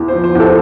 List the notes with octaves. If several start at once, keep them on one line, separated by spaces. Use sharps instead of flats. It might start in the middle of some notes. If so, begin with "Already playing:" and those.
Already playing: E2
F3 C5
C5
E2 A4